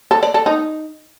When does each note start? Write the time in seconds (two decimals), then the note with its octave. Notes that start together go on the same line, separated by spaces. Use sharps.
0.11 A4
0.23 D5
0.34 A4
0.46 D#4